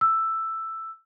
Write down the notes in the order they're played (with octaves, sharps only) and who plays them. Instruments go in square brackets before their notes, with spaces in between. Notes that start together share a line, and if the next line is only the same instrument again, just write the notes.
[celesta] E6